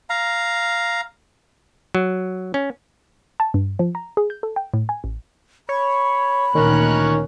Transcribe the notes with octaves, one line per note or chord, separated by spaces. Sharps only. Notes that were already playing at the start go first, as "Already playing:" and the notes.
F5 A#5
F#3
C#4
A5
G2
F3
A#5
G#4
G6
A4
G5
A2
G#5
A1
C#5 B5
D2 A#2 D#3 C#4 A#4 C#5 F#6